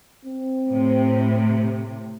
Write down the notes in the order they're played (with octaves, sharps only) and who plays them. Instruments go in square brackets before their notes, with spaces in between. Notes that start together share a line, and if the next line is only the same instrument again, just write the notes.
[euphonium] C4
[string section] A2 C3